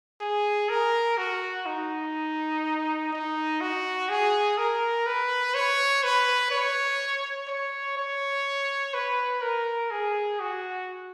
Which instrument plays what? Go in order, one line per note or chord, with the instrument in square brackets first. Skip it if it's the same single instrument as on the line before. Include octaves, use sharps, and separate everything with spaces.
[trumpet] G#4
A#4
F#4
D#4
D#4
F#4
G#4
A#4
B4
C#5
B4
C#5
C#5
C#5
B4
A#4
G#4
F#4